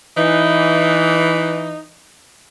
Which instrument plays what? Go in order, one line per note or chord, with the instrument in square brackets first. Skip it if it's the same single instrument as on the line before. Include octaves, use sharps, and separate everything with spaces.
[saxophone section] E3 [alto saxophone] D#4